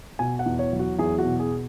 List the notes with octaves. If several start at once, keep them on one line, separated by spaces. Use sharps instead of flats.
B2 G#5
F#5
E2
C#5
F#3
F#4
E2 G#4
F#4
B2
G#4